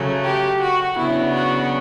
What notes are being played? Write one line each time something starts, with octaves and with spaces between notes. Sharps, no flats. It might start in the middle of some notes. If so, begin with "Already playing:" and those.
Already playing: C#3 F#3 A3
G4
F#4
C#3 F#3 B3 D4 E4
F#4